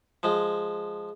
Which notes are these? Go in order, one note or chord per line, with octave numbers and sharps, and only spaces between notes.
F3 G#3